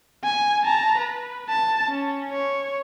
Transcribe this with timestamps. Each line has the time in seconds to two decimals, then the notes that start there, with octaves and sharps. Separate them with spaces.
0.24 G#5
0.65 A5 A#5
0.98 B4
1.49 A5
1.88 C#4
2.32 C#5